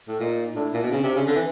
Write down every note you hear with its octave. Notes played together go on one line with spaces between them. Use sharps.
A2
A#2 D#4 F4
A2 D4 E4
A#2
B2
C#3 C4 D4
C3
C#3
D3
E3